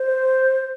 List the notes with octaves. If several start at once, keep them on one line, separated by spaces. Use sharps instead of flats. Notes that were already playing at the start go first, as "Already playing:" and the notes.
Already playing: C5